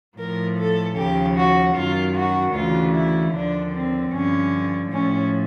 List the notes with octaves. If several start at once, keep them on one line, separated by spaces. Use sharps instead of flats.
A2 F3 A#4
A4
D#2 C#3 F3 G4
F#4
F#2 D#3 F4
F#4
D2 C#3 E3 F4
E4
D#2 D3 F3 D4
C4
G2 D3 F3 C#4
A2 F3 C#4